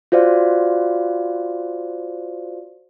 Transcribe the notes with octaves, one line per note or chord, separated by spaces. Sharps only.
F4 F#4 C5 D5 F5